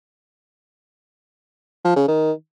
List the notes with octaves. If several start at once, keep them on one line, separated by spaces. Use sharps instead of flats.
F3
C#3
D#3